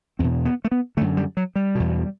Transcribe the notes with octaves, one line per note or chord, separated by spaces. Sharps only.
E2 B2 C4
B3
A3
B3
F#2 D3 A3
G3
F#3
G3
E2 B2